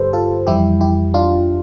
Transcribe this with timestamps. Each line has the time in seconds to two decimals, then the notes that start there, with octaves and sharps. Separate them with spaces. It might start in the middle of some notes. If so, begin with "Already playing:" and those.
Already playing: G2 D3 G3 G4 A4 B4 C5
0.13 F4 A4
0.47 F2 E3 G3 E4 G4
0.81 E4 G4
1.14 D4 F4